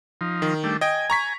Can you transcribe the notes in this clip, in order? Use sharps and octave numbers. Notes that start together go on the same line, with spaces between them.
F3 D#4
D#3
G3 A3 D4
D#5 G5 G#5
A#5 C#6 B6